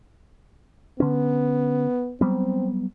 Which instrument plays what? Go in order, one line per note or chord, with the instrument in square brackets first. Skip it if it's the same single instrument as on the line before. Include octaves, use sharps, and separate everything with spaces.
[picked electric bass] D3 C#4 [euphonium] B3
[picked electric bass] F#3 G3 B3 [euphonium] C4